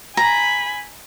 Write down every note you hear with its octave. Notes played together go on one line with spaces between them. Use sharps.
G#5 A#5 B5